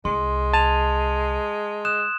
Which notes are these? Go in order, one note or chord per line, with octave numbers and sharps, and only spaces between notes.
C2 G#3 C6
A5 G#6 D#7 F7
D#6 F#6 E7